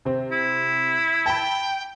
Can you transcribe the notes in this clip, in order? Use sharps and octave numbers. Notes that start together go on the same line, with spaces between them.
C3 C4
E4
G5 A5 B5